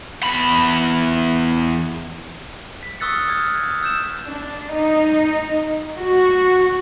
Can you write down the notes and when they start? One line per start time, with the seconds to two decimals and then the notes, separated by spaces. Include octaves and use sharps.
0.23 E2 B5
2.83 B6
3.00 C#6 D#6 E6 F#6 A6 C#7
3.15 F6
3.29 D#6 F6 G#6
3.68 D#6
3.83 E6 G6 E7
4.27 D4
4.73 D#4
5.97 F#4